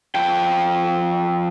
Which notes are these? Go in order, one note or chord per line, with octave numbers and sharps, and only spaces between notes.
F3 G5